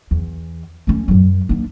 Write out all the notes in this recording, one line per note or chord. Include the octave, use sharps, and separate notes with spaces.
E2
A3 C#4
F#2 F#3
A#3 D4